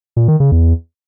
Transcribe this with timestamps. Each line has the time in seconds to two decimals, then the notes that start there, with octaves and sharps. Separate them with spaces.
0.16 A#2
0.28 D#3
0.40 C#3
0.52 E2